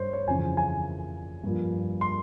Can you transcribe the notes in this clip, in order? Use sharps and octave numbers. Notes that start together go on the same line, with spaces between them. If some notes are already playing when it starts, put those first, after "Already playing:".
Already playing: G2 C5 C#5 C6
C#5
F2 C#3 E3 G#5
G#5
G2 F3 A#3
C6